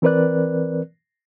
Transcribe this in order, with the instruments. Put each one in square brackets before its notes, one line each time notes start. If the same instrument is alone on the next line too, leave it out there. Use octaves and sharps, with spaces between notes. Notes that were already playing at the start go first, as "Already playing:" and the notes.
[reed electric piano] E3 C4 A#4 B4 D5 F#6